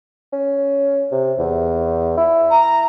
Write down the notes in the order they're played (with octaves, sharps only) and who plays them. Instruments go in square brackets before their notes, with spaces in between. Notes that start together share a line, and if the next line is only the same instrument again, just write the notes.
[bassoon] C#4
C3
E2
E4
[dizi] A#5